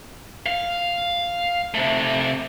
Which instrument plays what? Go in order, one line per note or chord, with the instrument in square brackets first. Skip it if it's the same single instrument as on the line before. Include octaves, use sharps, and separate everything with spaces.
[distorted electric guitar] F5
C3 A3